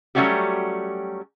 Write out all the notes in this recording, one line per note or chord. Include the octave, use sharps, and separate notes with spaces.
F#3 G3 A3 C#4 F#4 G4